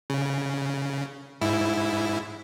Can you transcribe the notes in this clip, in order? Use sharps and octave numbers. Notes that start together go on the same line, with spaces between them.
C#3
G#2 E4